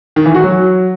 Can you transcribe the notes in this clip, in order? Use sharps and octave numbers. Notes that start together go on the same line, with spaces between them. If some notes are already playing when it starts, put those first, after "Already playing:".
D#3
E3
F#4
F#3